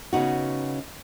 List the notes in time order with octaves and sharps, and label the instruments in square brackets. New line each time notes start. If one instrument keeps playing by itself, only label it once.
[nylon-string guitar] C#3 B3 D#4 F#4